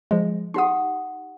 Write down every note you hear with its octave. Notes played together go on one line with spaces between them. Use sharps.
F3 G#3
D#4 G4 F#5 C6 D#6